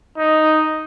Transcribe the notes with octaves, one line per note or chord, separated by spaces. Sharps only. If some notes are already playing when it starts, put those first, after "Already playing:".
D#4